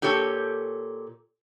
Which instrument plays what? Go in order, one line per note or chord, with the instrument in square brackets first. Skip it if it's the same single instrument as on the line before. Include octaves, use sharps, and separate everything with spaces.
[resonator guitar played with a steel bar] A#2 G4 A4 C#5 G5